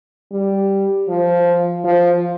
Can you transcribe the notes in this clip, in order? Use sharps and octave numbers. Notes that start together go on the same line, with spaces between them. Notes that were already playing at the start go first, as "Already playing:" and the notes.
G3
F3
F3